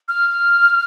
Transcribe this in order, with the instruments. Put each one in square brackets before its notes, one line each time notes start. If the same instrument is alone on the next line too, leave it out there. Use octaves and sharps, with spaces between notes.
[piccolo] F6